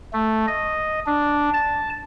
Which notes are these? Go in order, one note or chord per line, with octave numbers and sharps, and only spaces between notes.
A3
D#5
D4
A5